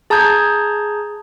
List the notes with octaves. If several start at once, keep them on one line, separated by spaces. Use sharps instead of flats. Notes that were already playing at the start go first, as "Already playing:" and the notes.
G#4 A5 A#5 D#6 G6 G#6